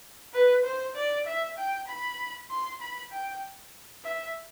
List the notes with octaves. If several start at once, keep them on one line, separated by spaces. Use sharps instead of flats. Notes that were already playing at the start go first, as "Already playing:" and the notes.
B4
C5
D5
E5
G5
B5
C6
B5
G5
E5